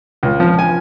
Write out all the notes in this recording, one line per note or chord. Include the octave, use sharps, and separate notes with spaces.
C#2
F3
G#5